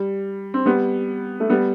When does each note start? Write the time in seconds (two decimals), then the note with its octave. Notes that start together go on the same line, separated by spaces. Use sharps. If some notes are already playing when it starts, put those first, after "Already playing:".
Already playing: G3
0.54 C4
0.65 G3 B3
1.40 A3
1.50 G3 B3